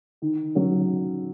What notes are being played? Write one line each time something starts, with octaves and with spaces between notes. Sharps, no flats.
D#3
F#3 C#4